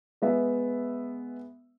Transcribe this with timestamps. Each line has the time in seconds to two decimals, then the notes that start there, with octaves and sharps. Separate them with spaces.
0.22 G#3 B3 E5